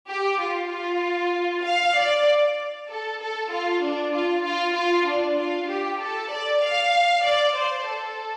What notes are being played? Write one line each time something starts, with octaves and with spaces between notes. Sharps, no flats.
G4
F4
F4
F5
D5
A4
A4
F4
D4
F4
F4
F4
D4
F4
G4
A4
D5
F5
D5
C5
A4